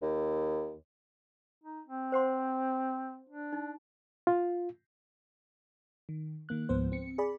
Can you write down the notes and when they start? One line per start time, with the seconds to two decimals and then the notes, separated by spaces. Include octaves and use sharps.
0.02 D#2
1.64 D#4
1.87 C4
2.12 C5 F#5 C6
3.29 D4
3.53 D#4
4.27 F4
6.09 D#3
6.49 D#3 A#3 F#6
6.69 C#2 G#2 F3 B3 C5
6.92 C4 C#7
7.18 G#4 D5 B5